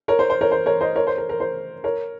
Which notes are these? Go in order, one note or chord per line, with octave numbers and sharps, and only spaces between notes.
A#4 C#5
C5
C5
A#4 C#5
C5
A#4 C#5
C5 D#5
A#4 C#5
C5
A#4
A#4
C5
A#4 C#5